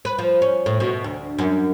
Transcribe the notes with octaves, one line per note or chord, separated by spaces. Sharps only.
B4
F3
C#4
A2
B2
D2
F#2